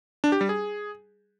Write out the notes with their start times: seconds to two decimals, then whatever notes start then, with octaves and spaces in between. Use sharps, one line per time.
0.24 D4
0.32 G4
0.41 G3
0.49 G#4